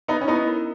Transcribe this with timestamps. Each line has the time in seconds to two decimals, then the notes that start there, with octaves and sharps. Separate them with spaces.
0.08 B3 D#4 E5
0.21 C#4
0.28 B3 D#4 E4
0.48 A#4